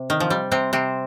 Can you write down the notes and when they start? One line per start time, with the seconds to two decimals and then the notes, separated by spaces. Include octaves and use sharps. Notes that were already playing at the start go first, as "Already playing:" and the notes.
Already playing: C3
0.10 D#3
0.20 F3
0.30 G3
0.52 C3 C4
0.73 C3 C4